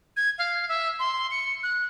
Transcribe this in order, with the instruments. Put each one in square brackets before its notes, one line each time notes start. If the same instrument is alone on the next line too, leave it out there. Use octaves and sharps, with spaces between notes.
[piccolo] G#6
F5
E5
C6
C#7
F#6